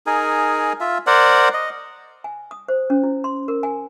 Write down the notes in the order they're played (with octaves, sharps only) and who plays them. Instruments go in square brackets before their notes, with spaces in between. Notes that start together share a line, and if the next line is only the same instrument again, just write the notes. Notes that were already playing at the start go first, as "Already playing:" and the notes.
[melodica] D#4 G#4 A#4 G#5
F4 E5
A#4 C5 D5 F#5
D#5
[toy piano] G#5
D#6
C5
C#4
E4
C6
A#4
G#5